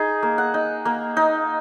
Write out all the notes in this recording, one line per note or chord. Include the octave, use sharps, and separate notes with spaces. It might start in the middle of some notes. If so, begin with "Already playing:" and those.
Already playing: D#4 G#4
A#3
F#5
D#4
A#3
D#4